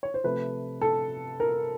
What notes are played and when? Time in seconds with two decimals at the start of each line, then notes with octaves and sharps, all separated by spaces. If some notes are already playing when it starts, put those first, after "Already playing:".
0.03 C#5
0.14 C5
0.24 C3 F3 A3 B4
0.81 A4
1.40 A#4